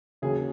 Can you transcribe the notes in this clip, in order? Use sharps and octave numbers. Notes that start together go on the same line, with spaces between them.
D#2 C#3 F#3 G#4